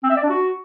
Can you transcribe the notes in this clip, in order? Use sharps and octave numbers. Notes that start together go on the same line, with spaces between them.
C4
E5
D5
D4
F#4